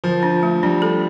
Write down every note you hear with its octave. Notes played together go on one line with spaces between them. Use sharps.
D3 F3
D4
A3
G3 D4
A4